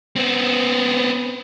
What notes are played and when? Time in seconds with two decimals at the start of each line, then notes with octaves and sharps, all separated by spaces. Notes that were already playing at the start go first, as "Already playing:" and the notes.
0.16 B3 C4